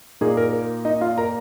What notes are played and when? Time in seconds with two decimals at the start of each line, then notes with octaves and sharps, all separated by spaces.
0.21 A#2 A#3 D#4 G#4
0.37 A#4
0.53 A#4
0.85 D#4 D#5
1.01 F4 F5
1.18 A#4 A#5